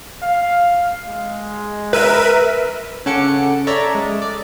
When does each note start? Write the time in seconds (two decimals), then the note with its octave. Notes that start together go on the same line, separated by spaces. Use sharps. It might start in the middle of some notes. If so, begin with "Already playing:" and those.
0.22 F5
1.08 G#3
1.93 A#4 B4 E5 D#7
3.06 C#3 C#4 A4 F#5 D6 C#7
3.67 A4 C#5 D5 E5 A#5
3.95 G#3
4.22 D5